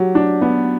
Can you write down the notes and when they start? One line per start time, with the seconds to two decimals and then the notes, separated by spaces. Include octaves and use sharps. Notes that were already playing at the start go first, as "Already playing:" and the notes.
Already playing: F#3 G4
0.15 D4
0.41 B3